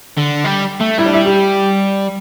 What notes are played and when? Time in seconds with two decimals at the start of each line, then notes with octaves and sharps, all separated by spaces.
0.18 D3
0.45 G3
0.81 A3
0.98 G3 E4
1.06 D4
1.14 E4
1.26 G4